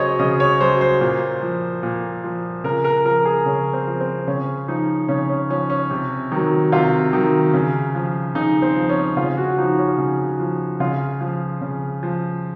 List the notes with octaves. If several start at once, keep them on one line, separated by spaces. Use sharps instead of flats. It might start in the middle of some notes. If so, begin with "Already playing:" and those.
Already playing: C#3 F#3 G#4 C5 C#5 D#5
C#3 D#5
C#5
F#3 C5
C5
A#2
F3
A#2
F3
C#3 A#4
A#4
F3 A#4
G#4
C#3 C#4
C4
F3
C4
C#3 C#4
F3 D#4
C#3 C#4
C#4
F3 C#4
C#4
C3
D#3 F#3
C3 F4
D#3 F#3
C#3
F3
C#3 D#4
C4
F3
C#4
C#3 F4
F#4
F3 D#4
C#4
C#3
F3
C#3 F4
F3
C#3
F3